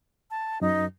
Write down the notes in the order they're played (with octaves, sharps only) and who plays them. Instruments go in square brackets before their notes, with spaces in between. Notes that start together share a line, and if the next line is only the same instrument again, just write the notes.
[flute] A5
[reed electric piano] F#2 [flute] D#4